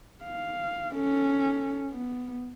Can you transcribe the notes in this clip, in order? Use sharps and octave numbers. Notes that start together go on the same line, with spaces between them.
F5
C#4 A4
B3